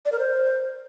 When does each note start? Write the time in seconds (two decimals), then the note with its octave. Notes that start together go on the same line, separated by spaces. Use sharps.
0.05 D5
0.12 A#4
0.19 C5